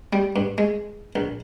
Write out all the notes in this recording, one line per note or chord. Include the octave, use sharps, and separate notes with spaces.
G3
G2
G#3
A#1